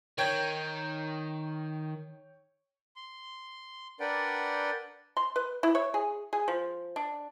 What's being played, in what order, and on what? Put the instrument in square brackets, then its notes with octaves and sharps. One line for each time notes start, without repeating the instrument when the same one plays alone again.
[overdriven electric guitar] D#3 [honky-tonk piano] C#5 G5 G#6
[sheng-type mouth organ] C6
D4 A#4 B4 D5 F#5 G5
[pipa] C6
B4
E4
C#5
G#4
G#4
F3
D4